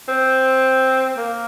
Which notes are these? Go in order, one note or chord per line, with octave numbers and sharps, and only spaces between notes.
C4
A#3